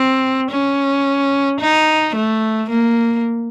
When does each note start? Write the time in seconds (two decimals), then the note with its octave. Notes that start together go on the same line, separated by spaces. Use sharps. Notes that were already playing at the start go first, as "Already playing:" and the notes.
Already playing: C4
0.51 C#4
1.61 D#4
2.16 A3
2.70 A#3